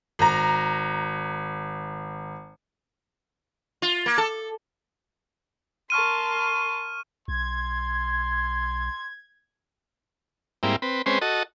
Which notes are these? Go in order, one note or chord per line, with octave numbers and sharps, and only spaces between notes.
G#1 A#5
F4
A#3
A4
A#4 A5 C6 C#6 F6 D#7
B1 C6 G#6
G#2 G3 A#3 C4 E4
C4 B4
G#3 C4 C#4 B4 C5
F#4 A4 D#5